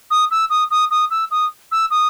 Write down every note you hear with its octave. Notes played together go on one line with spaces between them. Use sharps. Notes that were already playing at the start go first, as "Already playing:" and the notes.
D#6
E6
D#6
D#6
D#6
E6
D#6
E6
D#6